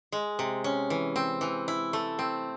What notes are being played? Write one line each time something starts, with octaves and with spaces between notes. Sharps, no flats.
G#3
C3
C#4
E3
C4
E3
E4
A3
C4